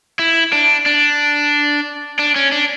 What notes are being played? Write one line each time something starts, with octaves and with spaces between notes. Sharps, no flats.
E4
D4
D4
D4
C#4
D4